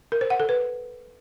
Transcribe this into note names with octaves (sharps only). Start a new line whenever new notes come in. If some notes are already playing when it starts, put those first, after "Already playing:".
A#4
C5
F#5
A4
B4